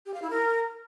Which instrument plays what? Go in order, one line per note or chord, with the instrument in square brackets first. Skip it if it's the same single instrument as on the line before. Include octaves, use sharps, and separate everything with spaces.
[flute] G4
F5
E4
A#4